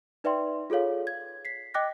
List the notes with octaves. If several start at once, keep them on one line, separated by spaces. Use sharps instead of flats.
D#4 B4 D5 E5 G5 C6
F4 G#4 A4 C#5 F5
G#6
B6 C7
D#5 G5 D6 F#6 A#6